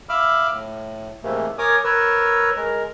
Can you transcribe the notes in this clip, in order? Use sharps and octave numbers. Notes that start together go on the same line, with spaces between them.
E5 F5 B5 D6 E6 F6
A2
G#2 C3 E3 A3 A#3
A#4 C#5 G#5 D6 D#6
A#4 B4 C#5 E6
G#3 A#4